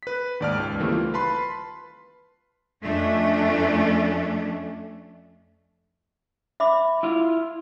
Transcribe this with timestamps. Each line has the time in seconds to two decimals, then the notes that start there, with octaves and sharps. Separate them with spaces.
0.03 B4 B6
0.40 D#2 G#2 D5 A5 F6
0.58 C#2
0.80 D#3 E3 G3 A3 A#3 C4
0.92 F4
1.14 B4 A5 B5 C6
2.82 F2 A3 C#4 D4
6.60 E5 B5 D6
7.03 E4 F4 F5